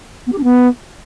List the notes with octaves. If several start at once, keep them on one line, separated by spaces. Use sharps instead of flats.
B3
G4
D4
B3